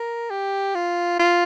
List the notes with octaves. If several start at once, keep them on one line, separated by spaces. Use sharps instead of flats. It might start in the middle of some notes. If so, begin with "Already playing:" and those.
Already playing: A#4
G4
F4
F4